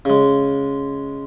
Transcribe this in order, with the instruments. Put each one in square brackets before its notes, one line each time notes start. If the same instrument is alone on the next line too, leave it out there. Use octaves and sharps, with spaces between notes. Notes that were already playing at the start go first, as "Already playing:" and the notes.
[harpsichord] C#3 G#3